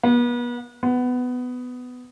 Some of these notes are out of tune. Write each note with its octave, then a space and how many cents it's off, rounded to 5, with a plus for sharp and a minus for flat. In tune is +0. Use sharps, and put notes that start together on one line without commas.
B3 -35
B3 +15